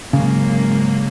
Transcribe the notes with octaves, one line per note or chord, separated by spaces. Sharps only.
G#2 C#3 F#3 A#3